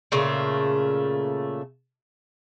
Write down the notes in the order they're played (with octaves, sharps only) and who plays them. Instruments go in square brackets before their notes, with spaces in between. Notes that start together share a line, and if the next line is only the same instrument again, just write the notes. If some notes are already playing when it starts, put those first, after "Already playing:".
[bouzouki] A#2 C#3 A3